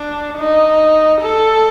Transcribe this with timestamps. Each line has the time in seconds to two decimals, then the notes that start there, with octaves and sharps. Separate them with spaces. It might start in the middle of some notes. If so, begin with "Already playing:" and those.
Already playing: D4
0.38 D#4
1.21 A4